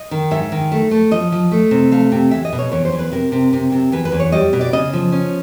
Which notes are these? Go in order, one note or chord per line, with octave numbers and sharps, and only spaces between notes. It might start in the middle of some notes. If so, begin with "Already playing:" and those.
Already playing: D#5
D#3
G#2 E5
D#3
A3
A3
F3 D#5
F3
A3
C3
A3 F5
C3
E2 E5
D#5
B2
C#5
E2 C#5
C5
E2
B4
C3 A#4
C3
C3
C3
E2 B4
B4
E2
C#5
G3 D#5
B2
D5
C#3 D#5
F3
C#4